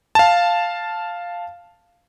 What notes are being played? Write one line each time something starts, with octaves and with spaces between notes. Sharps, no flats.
F5 A5